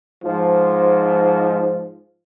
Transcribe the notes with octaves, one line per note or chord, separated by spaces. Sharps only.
G#2 F3